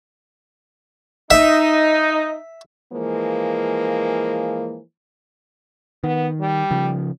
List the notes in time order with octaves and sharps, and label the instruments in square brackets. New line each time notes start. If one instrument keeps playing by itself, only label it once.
[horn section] D#4 [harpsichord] E5
[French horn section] E3 F3 G#3 A#3
[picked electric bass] D#3 [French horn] B3
[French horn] G3
[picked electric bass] C#3 F3